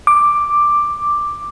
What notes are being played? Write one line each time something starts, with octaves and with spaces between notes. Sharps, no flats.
D6